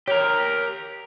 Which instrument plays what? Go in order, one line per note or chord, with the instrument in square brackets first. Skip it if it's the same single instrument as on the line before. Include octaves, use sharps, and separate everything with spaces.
[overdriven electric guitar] G4 A#4 [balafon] C#5